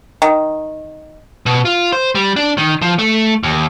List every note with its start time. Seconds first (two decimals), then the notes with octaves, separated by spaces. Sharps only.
0.22 D#3
1.46 B2
1.65 F4
1.93 C5
2.15 G3
2.36 D4
2.58 D#3
2.82 F3
2.99 A3
3.43 D#2